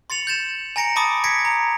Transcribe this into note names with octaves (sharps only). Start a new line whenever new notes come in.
C6 A6 C#7 F7 F#7
G6 A6 E7
G#5 A#5 A#6 C#7 D7
A5 B5 D6 D#6 A6
G#6 A#6 B6 C#7 D7
A#5